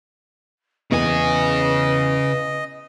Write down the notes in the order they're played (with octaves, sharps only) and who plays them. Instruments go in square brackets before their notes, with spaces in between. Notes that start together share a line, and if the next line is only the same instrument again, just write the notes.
[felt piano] E2 B3 [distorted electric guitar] C#3 G#5 [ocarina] B4 [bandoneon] D#5